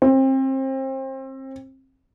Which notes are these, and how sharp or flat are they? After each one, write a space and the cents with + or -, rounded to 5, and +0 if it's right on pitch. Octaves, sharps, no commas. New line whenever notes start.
C4 +30